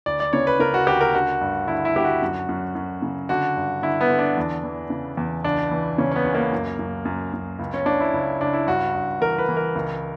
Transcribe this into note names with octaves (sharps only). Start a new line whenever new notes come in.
D2 D5
D5
C#3 C#5
B4
C#3 A#4
F#4
D2 G4
A#4
D3 F#4
G2
D3 E4
E4
D3 G4
F#4
F#2
F#2
F#2
C#3
D3 F#4
G2
D3 E4
B3
D3
D4
E2
E3
C#3
E2
C#2 D4
E3
C#3 C#4
C#4
B3
C#2
A#3
F#2
F#2
F#2
F#2
C#2
C#4
C#3 D4
E4
C#2
C#2 D4
E4
G2 F#4
G2
E3 A#4
B4
E3
A#4
C#2